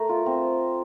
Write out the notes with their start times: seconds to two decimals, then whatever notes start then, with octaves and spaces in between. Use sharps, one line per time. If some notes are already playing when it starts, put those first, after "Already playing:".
Already playing: A3 A#4
0.09 F4
0.26 C4